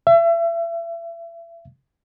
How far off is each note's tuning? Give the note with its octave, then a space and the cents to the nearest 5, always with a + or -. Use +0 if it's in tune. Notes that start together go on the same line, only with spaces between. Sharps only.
E5 +35